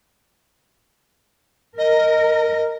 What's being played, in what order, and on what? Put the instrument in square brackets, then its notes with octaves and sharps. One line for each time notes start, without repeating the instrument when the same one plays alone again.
[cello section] A#4 [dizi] D#5